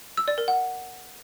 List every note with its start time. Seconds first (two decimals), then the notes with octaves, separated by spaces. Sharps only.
0.17 E6
0.28 D5
0.38 A#4
0.48 F#5